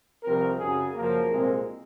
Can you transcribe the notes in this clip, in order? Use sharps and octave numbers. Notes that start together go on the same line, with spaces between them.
C2 C3 F3 C4 A#4
F#2 C#3 F#3 G#4
F#2 C#3 F3 A#3 A#4
C2 A#2 G#3 C4